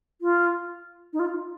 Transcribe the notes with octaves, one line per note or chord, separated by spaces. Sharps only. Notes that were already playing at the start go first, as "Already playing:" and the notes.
F4
D#4
F4